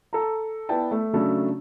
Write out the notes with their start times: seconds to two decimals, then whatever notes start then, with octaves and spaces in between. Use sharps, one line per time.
0.13 A4 A#5
0.69 B3 E4 D5 G5 A5
0.91 A3
1.13 C#3 F#3 A3 D4 A4